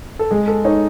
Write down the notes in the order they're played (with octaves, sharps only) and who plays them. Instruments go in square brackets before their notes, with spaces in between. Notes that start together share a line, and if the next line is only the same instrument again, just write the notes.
[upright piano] A4
[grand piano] G#3 [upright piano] G#4
[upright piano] A4
[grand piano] D#4 [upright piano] C#5